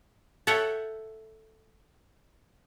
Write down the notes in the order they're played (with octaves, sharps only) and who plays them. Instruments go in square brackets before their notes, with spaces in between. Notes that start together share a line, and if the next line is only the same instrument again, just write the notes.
[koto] A4 C#5 E5 F#5 G5